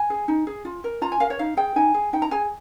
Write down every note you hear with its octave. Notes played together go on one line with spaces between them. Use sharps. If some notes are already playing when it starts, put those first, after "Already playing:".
Already playing: G#5
G#4
D#4
G#4
F4
A#4
F4 A#5
G#5
A#4 F5
C#5
D#4 F5
G#4 G5
D#4 G#5
G#4
D#4 G5
A#5
G#4 G#5